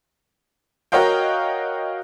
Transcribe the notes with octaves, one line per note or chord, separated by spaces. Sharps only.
F#4 A#4 C#5 D#5 F5 G5